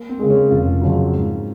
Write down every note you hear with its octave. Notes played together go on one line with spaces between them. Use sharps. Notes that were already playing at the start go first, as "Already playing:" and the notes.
Already playing: A#3
C4
C#3 G#3
C#4
F1 F4
F2 C#3 F#3
G#2